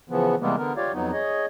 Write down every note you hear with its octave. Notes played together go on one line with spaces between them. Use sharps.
C#3 E3 F3 B3
C3 E3 G3 G#3 A#3 B3
D3 B3 A#4
F4 G4 C#5 D5 F5
F2 F#3 B3 D#4
G#4 C#5 D#5